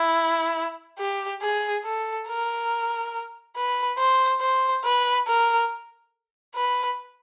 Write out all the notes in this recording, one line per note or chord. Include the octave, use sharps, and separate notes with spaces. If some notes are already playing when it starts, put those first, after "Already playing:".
Already playing: E4
G4
G#4
A4
A#4
B4
C5
C5
B4
A#4
B4